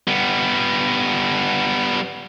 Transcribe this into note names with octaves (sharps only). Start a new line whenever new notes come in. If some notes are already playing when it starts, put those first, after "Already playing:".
G3 B3